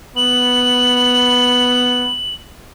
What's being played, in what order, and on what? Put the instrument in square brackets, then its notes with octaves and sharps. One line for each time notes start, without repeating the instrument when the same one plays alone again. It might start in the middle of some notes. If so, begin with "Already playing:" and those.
[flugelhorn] B3 [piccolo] F#7